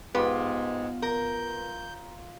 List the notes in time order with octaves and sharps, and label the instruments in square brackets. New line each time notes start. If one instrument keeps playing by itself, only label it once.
[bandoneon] G#2 G#3 [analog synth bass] B3 [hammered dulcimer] F4 [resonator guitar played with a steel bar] G4
[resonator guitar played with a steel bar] A#4 [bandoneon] G6